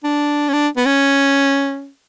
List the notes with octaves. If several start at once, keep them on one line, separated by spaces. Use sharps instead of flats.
D4
C#4
D4
B3
C#4